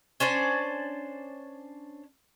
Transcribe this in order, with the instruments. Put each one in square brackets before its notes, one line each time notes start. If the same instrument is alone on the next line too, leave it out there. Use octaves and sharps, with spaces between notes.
[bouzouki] C#4 D4 C5 D5